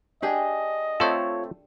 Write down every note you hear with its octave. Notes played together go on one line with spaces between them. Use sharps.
D4 G4 G#4 D#5
A3 C4 F4 A4 C#5